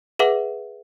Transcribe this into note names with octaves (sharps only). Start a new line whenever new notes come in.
G#4 B4 E5 F#5 D6